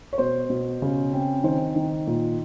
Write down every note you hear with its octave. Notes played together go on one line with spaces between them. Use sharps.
C#5
B2 C5
B2
C#3
C4
D#3 C5
D#3
A#2